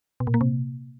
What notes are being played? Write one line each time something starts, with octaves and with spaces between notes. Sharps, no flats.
B2
A#2
A#3
C3